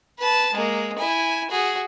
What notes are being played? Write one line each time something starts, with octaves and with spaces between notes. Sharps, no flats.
B4 A5
G#3 A#3
E4 G#5
F#4 G#4